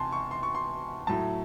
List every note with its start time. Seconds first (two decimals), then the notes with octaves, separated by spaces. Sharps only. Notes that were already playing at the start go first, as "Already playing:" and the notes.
Already playing: E2 C3 G#5 A5 C6
0.12 C#6
0.31 C6
0.43 C#6
0.55 C6
1.07 A2 F#3 A3 A5